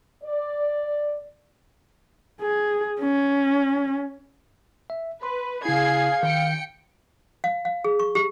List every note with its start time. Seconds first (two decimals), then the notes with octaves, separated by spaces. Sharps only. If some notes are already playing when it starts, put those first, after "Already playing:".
0.24 D5
2.41 G#4
3.00 C#4
4.90 E5
5.23 B4 C6
5.65 C#3 E4 G#4 F5 G#6 C7
6.23 D#3 G5 C#7
7.44 F5
7.65 F5
7.84 G#4
7.99 C#6
8.15 G4